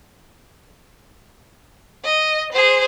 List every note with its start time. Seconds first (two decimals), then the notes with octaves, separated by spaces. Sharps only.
2.04 D#5
2.52 G#4 C5